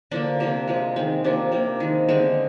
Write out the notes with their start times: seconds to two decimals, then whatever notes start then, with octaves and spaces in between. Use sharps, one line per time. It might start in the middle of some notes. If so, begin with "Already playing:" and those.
0.11 D3 F3 A#3 D4
0.40 C3 F3 A#3
0.67 C3 F3 G#3
0.96 D#3 G#3 C4
1.24 C3 F3 A#3 D4
1.52 C3 F3 A#3
1.80 D#3 G#3
2.09 D3 G#3 C4